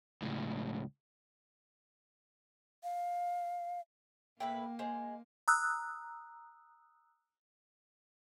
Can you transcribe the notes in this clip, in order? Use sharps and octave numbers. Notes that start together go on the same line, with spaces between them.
C#2 A2
F5
A2 A#3 E4 B4 G5
G#3 C5
A#5 D#6 E6 F#6